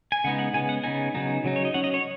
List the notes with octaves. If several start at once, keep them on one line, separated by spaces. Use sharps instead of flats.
G#5
C#3 G#3 B3 D#4 F#5
F#5
C#3 G#3 B3 G#5
F#5
C#3 B3 D#4 G#5
C#3 F#3 B3 D#4
C#3 F#3 D#4
C#5
D#5
F#3 C#4 F#5
D#5
C#5